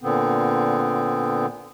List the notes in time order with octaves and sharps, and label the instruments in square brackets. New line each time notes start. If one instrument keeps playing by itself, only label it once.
[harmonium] A#2 D3 B3 C4